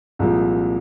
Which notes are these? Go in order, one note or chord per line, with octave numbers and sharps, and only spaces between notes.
C2 A#2 F3 G#3